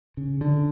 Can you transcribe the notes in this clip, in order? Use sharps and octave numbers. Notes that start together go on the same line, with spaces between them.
C#3
D3